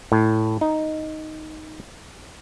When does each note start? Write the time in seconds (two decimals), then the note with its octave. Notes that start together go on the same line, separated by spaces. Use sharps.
0.12 A2
0.61 D#4